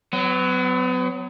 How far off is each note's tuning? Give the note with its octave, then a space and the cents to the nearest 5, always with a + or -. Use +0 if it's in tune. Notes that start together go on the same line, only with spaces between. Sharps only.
F#3 +0 B3 +40